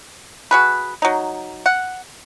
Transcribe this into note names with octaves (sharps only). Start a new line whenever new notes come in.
F#4 G#4 B4
F#3 D#4
F#5